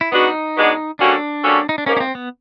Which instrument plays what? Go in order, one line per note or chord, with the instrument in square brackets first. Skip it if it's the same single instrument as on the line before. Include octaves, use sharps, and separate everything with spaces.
[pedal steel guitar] E4
[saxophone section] B2 G#3 B3 D4 F#4 [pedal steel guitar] D#4
[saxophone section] B2 G#3 B3 D4 F#4
[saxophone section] G3 A#3 C#4 F#4 A4 [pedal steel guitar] D4
[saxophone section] G3 A#3 C#4 F#4 A4
[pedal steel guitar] D#4
D4
[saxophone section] G#2 F3 A#3 [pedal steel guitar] C#4
[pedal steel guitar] C#4
C4
B3